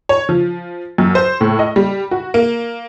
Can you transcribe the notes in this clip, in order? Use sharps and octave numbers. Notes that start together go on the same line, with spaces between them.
C#5
F3
F#2
C5
A2
D#5
G3
F#4
A#3